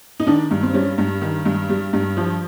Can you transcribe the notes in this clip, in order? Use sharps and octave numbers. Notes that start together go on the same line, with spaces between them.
D#4
D#3 D4
G2
C4
G3 C#4
G2
D#3
G2
G3
G2
F3